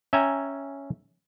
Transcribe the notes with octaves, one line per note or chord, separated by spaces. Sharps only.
C#4 E5 G5 G#5 A#5